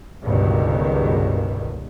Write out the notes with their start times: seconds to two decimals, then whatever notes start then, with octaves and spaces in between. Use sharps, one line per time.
0.23 G1 C#2 G2 B2 D#3